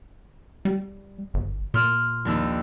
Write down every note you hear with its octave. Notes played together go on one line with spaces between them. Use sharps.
G3
G1
A#2 C6 F6
A#1 D#2 E6